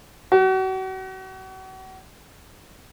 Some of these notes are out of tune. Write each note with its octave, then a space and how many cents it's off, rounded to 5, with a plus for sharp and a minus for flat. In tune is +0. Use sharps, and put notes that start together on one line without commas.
F#4 +35